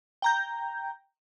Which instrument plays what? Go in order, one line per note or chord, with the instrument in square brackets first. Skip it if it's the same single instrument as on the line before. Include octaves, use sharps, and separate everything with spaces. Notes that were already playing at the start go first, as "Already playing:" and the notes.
[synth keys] G5 A#5 G6